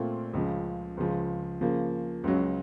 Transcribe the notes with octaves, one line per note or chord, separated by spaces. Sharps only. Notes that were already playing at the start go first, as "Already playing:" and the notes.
Already playing: A#2 A3 C4 F4
C#2 C#3 F3
C#2 C#3 F3
C#3 F3 A#3
C#2 C#3 F#3